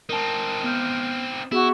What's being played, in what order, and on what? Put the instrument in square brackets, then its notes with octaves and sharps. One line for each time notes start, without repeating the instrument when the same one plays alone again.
[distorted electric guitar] C4 D#4 [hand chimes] A#4 A5
[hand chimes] B3 F6 G6
[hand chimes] B3 G#4 [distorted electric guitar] E4 [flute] F#4